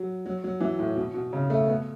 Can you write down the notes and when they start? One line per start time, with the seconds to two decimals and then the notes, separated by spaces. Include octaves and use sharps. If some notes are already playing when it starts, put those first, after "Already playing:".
Already playing: F#3
0.26 F#3
0.44 F#3
0.60 E3
0.79 A2
0.96 B2
1.14 B2
1.33 C#3
1.50 A3
1.68 B3